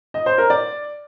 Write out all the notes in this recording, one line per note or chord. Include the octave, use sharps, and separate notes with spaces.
D#5
C5
A#4
D5